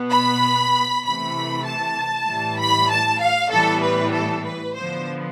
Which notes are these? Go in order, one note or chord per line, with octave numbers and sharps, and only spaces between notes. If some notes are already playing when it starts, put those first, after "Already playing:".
Already playing: B2 B3
B5
C3 E3 A3 B5
A5
A2 E3 G3
B5
A5
F5
A2 E3 G3 B3 A4
B4
A4
B4
D3 F3 B3 C5